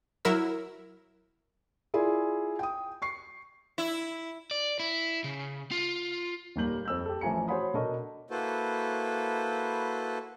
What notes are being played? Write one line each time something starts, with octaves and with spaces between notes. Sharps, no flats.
F#3 E4 A#4 E6
E4 F4 G#4 D5
G5 D#6
C#6 C7
E4
D5
E4
C#3
F4
D#1 D#2 G3 A#3 G6 F#7
F2 E6 G6
G4 A4
A1 E3 F3 G#5 A#5 C#7
F#4 C5 C#5 F#5 B5 D#6
B2 D4 A4 A#4 D#5 C#6
A#3 E4 F#4 A4 B4 C5